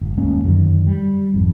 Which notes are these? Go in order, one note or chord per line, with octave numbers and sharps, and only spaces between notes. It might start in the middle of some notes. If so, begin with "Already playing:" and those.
G1
D#1 G#3 A#3 C#4
F#2 D3 D#3 F#3
G3
G#1 F2